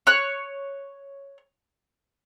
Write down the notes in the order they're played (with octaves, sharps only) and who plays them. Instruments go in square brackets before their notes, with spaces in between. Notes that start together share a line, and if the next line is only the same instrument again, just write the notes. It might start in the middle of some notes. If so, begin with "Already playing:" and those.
[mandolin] C#5 F#6